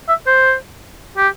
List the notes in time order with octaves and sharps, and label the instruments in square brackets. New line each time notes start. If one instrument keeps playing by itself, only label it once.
[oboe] E5
C5
G4